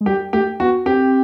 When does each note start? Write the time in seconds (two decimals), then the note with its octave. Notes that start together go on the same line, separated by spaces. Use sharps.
0.01 G#3
0.06 G3 G4
0.33 A3 G4
0.60 B3 F#4
0.86 C4 G4